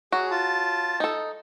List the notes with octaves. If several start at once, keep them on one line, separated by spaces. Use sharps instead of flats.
F#3 F#4 G#4
F4 A5
D#4 A4